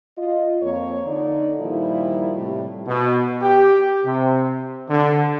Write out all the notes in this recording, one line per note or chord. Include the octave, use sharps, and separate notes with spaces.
F4 D#5
F2 A#3 C#5
D3 D#4 D5
A#2 D#3 F3 G3 E4
A2 C3 G3
B2
G4
C3
D3